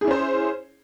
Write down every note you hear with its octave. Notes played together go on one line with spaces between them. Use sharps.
C#4 E4 G#4 C5